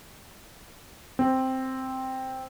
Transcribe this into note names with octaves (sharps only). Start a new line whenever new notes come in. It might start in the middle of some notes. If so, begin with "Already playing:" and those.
C4